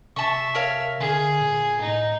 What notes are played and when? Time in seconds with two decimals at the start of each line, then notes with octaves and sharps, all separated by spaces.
0.16 C3 E5 A5 C#6
0.55 A#4 C#5 F5
1.00 D3 G#4
1.40 A#2
1.81 A2 D#4